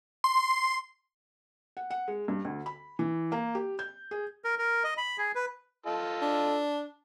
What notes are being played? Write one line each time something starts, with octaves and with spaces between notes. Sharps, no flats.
C6
F#5
F#5
G#3
G2
D2
B5
E3
A#3
G4
G6
G#4
A#4
A#4
D#5
B5
G#4
B4
F4 A4 D#5
D4